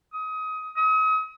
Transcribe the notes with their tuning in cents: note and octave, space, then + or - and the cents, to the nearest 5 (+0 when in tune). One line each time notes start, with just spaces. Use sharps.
D#6 +25
D#6 +40